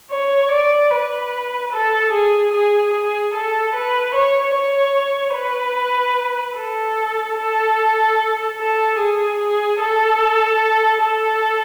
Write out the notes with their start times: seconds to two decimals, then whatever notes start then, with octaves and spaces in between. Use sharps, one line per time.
0.11 C#5
0.51 D5
0.91 B4
1.72 A4
2.12 G#4
2.53 G#4
2.93 G#4
3.34 A4
3.74 B4
4.15 C#5
4.55 C#5
5.35 B4
6.57 A4
7.37 A4
8.58 A4
8.99 G#4
9.40 G#4
9.80 A4
11.00 A4